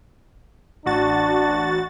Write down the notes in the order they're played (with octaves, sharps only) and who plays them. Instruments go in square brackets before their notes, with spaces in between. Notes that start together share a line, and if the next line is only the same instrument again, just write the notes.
[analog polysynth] A1 F#4 A6 [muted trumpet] D4